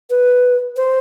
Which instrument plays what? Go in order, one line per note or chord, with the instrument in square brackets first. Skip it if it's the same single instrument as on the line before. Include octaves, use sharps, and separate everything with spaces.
[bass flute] B4
C5